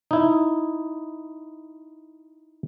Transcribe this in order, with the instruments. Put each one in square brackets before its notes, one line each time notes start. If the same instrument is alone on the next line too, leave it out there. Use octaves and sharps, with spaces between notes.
[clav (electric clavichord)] D#4 E4